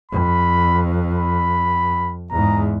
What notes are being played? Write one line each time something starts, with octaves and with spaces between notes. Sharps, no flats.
F2 B5
B5
E2 G#2 A#5